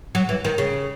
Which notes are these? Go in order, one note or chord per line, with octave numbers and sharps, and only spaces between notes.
F#3
E3
D#3
C#3